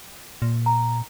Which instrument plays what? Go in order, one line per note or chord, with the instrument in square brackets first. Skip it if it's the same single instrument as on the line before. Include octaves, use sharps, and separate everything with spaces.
[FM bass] A#2
[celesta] A#5